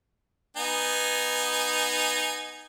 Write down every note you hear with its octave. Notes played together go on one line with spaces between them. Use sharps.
B3 D#4 G#5